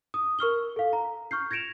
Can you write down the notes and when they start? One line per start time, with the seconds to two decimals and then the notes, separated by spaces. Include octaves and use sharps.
0.14 D#6
0.39 A#4 C#6 F6 G7
0.76 A4 F5
0.93 A#5
1.31 C#6 F6 G6 C7
1.51 G#6 A#6 C#7 D7 E7 F7